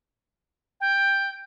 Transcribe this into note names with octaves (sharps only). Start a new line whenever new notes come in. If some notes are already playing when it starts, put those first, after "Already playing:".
G5